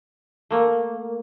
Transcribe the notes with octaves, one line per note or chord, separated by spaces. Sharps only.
A3 A#3